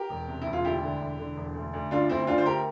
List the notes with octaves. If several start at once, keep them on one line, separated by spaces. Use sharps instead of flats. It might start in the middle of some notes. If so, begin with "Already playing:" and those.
Already playing: G4 A#4
E1
C3
E1 E4
F4
D2 E4 G4
D3
E1
D3
E1
D2
D2
D2 D4 F4
D2 C4 E4
D2 D4 F4
C5
D2 G4 A#4